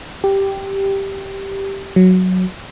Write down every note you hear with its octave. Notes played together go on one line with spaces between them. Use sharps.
G4
F#3